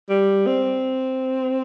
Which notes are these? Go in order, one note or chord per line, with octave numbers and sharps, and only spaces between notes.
G3
C4